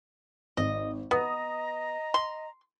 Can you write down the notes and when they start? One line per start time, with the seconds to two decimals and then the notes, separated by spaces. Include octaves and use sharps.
0.57 G#1 D#5
1.11 B3 D#5 A#5 D#6
2.14 C6